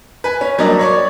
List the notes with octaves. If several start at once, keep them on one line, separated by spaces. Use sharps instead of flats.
B4 G#5
C#4
F#3 G3 A#3 D4 D#5
C#5 D5 C#6
C#5